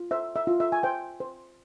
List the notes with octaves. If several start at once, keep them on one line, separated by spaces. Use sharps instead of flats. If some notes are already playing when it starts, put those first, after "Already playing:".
Already playing: F4
C5 E5
E5
F4
E5
G#5
C5 G5
C5